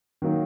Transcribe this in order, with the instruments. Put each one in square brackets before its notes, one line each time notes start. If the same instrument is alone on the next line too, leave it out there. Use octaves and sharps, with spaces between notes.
[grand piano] D#3 F#3 A#3 D#4